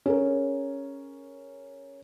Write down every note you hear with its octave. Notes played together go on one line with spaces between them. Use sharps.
C#4 G#4 A#4